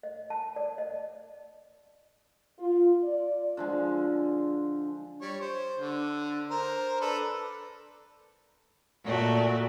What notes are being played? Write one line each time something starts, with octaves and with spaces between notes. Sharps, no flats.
D#5
A5
D5
D#5
F4
D5
D3 F3 G#3
G3 C#5
C5
D3
A#4 C5
D4 A4 B4
A#2 A3 F#4 D5